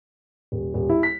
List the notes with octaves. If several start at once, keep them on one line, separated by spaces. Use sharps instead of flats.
D#1
D#1
E4
B6